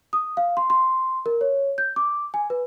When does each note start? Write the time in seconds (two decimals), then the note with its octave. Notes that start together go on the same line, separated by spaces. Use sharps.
0.13 D#6
0.37 F5
0.57 C6
0.70 C6
1.26 A#4
1.41 C#5
1.78 G6
1.96 D6
2.34 G#5
2.50 B4